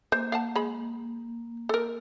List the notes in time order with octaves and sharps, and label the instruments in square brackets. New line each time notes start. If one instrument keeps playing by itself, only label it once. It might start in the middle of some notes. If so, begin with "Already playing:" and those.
[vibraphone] A#3 [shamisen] C5
[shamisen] F5 F#5 A5
G#3 B5
A4 A#4